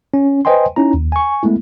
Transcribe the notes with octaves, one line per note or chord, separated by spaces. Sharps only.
C#4
B4 C5 D#5 G5 G#5 C6
C#4 D#4 E4 A#5
D#2
G#5 C#6
G#3 A3 B3 E4